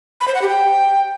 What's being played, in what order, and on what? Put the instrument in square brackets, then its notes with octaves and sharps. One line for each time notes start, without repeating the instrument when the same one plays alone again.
[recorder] B5
C5
F#5
G4
G5